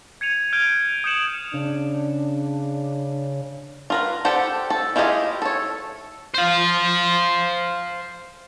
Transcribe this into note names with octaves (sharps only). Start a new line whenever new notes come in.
G#6 C#7 D#7 F7
F6 G6 G#6 D7 F7
D#6 F#6 G6 C#7 E7 F#7
C#3 D4
F4 A#4 B4
G4 A4 C5 D5 F#5
A4
E4 F4 G4 G#4 D#5
A4 C#5
C5 F5